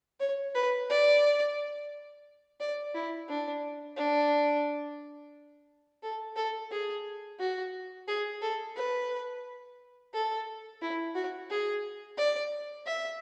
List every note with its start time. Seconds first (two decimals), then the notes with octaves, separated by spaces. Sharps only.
0.20 C#5
0.55 B4
0.90 D5
2.60 D5
2.95 E4
3.29 D4
3.97 D4
6.03 A4
6.36 A4
6.71 G#4
7.39 F#4
8.08 G#4
8.42 A4
8.77 B4
10.14 A4
10.82 E4
11.15 F#4
11.50 G#4
12.18 D5
12.86 E5